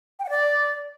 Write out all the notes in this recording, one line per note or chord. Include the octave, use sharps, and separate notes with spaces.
G5
F#5
D5